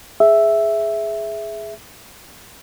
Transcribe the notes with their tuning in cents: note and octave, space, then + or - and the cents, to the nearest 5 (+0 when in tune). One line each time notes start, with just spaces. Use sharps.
G#4 +10 E5 +0